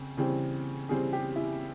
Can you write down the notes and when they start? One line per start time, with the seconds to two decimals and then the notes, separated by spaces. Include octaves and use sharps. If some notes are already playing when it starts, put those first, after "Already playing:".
Already playing: C#3 C4
0.17 C#3 E3 G3 C4
0.89 C#3 E3 G3 C4 G#4
1.13 G4
1.36 E4